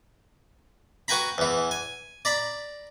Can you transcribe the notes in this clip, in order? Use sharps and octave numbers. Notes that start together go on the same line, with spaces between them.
F#4 B4 G5 G#5 A#5 B5
E2 E3
G#5
D5 A#5 B5